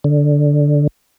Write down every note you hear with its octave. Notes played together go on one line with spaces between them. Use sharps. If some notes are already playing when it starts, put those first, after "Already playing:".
D3